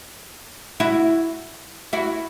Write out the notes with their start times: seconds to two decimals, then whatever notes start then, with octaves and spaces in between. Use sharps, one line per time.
0.80 E4 F#4
1.93 E4 F#4